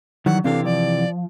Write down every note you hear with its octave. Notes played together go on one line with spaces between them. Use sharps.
D#3 E3 F#3 G3 F#5
C3 E3 C4 D4 G4 A4 F5
F3 D5